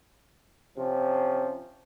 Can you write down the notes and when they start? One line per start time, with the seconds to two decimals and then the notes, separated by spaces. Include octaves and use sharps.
0.77 C3 F3 C#4